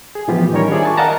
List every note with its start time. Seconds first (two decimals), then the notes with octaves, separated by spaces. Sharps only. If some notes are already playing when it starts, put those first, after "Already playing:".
0.15 G#4
0.28 A2 E3 F3 B3 F4 G4
0.53 D#3 G3 C#4 A#4 C#5
0.70 D4 F4 G#4 C5 D5 E5
0.83 G#5 A5 C#6
0.97 A#4 D#5 F5 F#5 A5 A#5